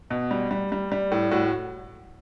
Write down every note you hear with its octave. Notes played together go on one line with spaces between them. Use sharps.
B2
G3
G3
G3
G3
A2
A2 F#4